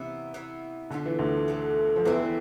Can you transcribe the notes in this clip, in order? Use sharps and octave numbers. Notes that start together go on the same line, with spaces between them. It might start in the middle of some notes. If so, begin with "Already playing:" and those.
Already playing: C3 E3 B3 E4
E3 B3 E4
B2 D3 B3 F4 A4
E3
D2 D3
B2 B3 F4 A4
F3
E2 D3 E3 A3 C4 E4
E3